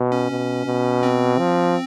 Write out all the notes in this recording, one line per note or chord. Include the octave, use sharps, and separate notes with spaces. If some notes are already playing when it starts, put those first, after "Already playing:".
Already playing: B2
C#4
B2
B2
C4
F3